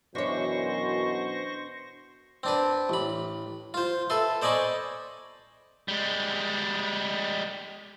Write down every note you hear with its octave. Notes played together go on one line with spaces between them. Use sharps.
F#2 B2 E3 D4 C5 C#5 C#6 A#6
C4 D4 B4
A1 B5
F4 C5
A4 B4 E5 C6
C5 D5 D#5 G#5 B5 C#6
G3 G#3